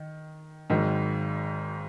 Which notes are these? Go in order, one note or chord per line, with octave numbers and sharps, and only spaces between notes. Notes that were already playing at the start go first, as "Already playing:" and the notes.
Already playing: D#3
G#1 G#2 D#3 F#3